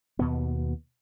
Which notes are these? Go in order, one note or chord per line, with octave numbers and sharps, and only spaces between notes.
D#2 B2 B3